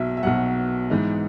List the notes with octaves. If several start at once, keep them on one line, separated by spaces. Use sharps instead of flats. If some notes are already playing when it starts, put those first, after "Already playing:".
Already playing: B1 B2 F#3 E5
E5
B1 B2 F#3 F#5
G#2 E3 G#3 B3 D#4